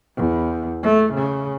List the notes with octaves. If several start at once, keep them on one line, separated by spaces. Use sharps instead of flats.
E2
A3
C#3